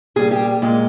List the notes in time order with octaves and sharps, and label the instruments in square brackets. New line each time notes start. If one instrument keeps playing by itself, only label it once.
[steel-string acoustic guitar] A#2 G3 G#4
G4
A#2 G#3